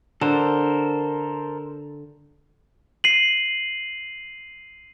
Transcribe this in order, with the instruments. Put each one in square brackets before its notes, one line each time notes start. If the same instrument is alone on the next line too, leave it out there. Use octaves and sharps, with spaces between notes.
[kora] D3 [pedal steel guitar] A4 A#4 C5
[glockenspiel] C7 D#7 F#7